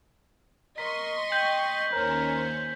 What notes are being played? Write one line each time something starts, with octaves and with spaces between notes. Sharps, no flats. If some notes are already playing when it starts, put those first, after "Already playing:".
A#4 D#5 C6 C#6 B6
G5 G6 B6 F#7
D#2 C#4 A#4 C5